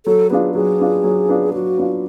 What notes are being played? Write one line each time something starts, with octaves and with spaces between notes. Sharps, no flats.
F#3 A4
B3 D4 F4 G#4
F#3 G#4
B3 D4 F4
F#3
B3 D4 F4
F#3 F#4
B3 D4 F4